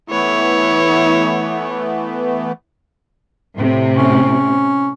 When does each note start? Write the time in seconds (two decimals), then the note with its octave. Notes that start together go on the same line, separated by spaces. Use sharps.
0.10 E3 A3 B3 E4 C#5
3.55 A2 C3
3.97 C#4